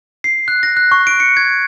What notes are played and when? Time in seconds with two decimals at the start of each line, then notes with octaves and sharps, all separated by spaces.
0.24 C7
0.48 F#6
0.63 A#6
0.77 F#6
0.92 C#6
1.07 D7
1.20 C#7
1.37 G#6